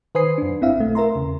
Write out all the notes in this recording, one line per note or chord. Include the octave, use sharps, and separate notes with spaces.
D#3 B4 C5 G#5 D#6 C7
F#2 D4
G#1 C4 E4 E5 F5
B1 A3
A#4 E5 A#5 C6
E2 C#3